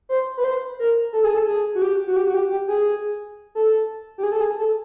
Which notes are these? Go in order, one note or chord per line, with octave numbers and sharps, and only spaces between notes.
C5
B4
C5
A#4
A4
G#4
A4
G#4
F#4
G4
F#4
G4
F#4
G4
G4
G#4
A4
G4
G#4
A4
G#4
A4